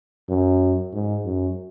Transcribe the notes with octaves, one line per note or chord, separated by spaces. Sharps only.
F#2
G#2
F#2